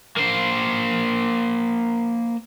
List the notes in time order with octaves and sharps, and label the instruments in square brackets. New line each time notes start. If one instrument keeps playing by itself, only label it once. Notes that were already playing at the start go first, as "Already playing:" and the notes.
[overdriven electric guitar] A#3 C5